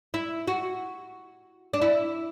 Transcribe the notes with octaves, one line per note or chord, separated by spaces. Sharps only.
E4
F#4
D4
E4